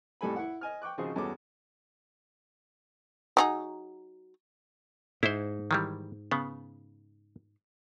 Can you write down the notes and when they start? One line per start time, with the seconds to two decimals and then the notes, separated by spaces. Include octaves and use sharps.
0.21 F2 A2 G3 A4 G#5 B5
0.36 E4 F#5
0.61 D#5 G#5 F6
0.82 G5 C#6 D6 F#6
0.98 G#1 C#3 F3 F#4 G#4 C5
1.16 E2 G2 C#4 F#4 A4 D6
3.37 F#3 D#4 G#4
5.23 G#2 E4 C5
5.71 D#3 E3 G3
6.31 C#3 B3